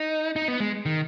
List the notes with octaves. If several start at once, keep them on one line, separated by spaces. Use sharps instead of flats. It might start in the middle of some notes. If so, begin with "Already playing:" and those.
Already playing: D#4
D#4
B3
G#3
D#3